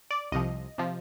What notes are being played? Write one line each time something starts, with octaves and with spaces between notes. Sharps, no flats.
D5
C2 C3 F3 D#5
C3 F3